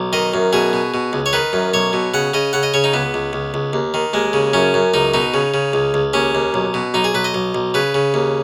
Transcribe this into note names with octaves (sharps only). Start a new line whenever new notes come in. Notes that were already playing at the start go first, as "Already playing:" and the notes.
Already playing: B1
D#3 D#5
F#2
B2 G#4
B2
B2
C#2
C#5
D#3 B4
F#2
B1 C#5
B2
C#3 F#5
C#3 D#5
C#3 F#5
D#5
C#3 C#5
D#4
C#2 B3
C#2
C#2
C#2
D#2
D#3
D#2 G#3
C#3
F#2 C#4
F#2
C#2 D#4
B2 D#4
C#3
C#3
C#2
C#2
D#2 C#4
D#2
B1
B2
B1 D#4
G#4
B1 B4
D#5
B1
B1
C#3 B4
C#3
D#2